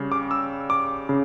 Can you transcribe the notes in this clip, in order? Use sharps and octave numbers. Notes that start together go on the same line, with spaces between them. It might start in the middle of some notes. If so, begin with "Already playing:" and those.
Already playing: C#3 G3
D6
E6
D6
C#3